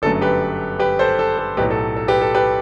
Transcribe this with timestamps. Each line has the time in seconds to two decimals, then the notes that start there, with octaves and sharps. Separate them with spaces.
0.02 G1 F#2 D3 F#3 A3 A4
0.21 G4 B4
0.79 G4 B4
0.99 A4 C5
1.19 A4
1.38 A4
1.57 B1 A2 F#3 G4 B4
1.70 A4
1.96 A4
2.08 G4 B4
2.21 A4
2.35 G4 B4